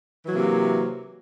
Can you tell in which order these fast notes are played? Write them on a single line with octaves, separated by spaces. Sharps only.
E3 F#3 A#3 C3